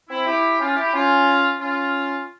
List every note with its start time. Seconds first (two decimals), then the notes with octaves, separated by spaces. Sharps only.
0.09 C4 E4
0.26 E4 G4
0.60 C#4 F4
0.76 E4 G4
0.93 C#4 F4
1.60 C#4 F4